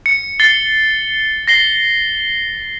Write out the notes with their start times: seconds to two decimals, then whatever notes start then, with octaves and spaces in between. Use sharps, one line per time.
0.06 C#7
0.39 A6 C7 G7
1.48 A#6 C7 G7